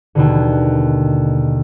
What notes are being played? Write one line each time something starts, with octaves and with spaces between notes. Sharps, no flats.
D#2 B2 D3